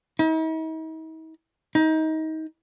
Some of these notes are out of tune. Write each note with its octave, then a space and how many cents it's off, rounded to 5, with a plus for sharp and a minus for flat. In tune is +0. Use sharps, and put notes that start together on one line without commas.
D#4 +45
D#4 +25